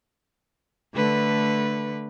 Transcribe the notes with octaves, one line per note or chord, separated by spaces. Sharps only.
D3 A3 B4